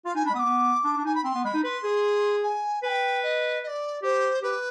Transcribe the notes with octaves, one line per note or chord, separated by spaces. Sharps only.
F4 F5
D#4 G#5
D4 B5
G#3
B3 D#6
D6
B3
D4
D4
D#4 G#5
B5
C4 C6
B3
G#3 B5
D#4
B4 C6
G#4
G#5
B4 G5 G#5
D#5
D#5
D5
G4 C5
G4 B4